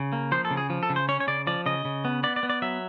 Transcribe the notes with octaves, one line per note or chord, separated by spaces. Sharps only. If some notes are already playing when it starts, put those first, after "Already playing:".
Already playing: C#3
A#3
F3 C5
A4
C#3
G#4
F3
A4
C#3
C5
C#4 C#5
C#5
C#3 D5
F3 D5
C#3 D#5
C#3
B3
B3 D5
D5
B3
D5
F#3 E5